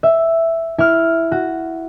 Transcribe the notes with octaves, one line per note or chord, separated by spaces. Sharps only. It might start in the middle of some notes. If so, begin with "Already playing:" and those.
E5
E4 F6
F#4